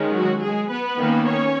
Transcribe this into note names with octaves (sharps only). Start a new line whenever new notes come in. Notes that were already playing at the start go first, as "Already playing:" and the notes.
Already playing: D#3 G#3 C#4
F#3 F#4
G#3 G#4
B3 B4
D#3 A#3 C#4
C#4 C#5